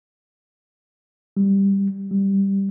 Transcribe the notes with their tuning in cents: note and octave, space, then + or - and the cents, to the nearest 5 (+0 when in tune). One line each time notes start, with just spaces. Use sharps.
G3 +5
G3 +0